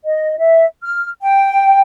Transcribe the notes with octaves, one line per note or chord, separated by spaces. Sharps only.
D#5
E5
F6
G5